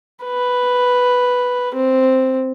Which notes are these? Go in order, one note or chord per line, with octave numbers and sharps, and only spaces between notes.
B4
C4